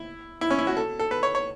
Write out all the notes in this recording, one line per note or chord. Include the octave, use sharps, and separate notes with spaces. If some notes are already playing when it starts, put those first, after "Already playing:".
Already playing: E4
E4
C#4
E4
F#4
A4
A4
B4
C#5
C#5